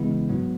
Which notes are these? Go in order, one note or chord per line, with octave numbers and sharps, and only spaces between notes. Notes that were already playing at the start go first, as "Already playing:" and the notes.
Already playing: C#3 E3 G#3 B3 E4
G#2 F#3 B3